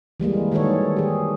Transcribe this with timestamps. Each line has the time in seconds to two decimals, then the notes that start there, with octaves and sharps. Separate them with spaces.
0.20 E3 G3 G#3 A#3
0.52 D#3 G3 F#4 G#4 A4 C#5
0.97 G4 G#4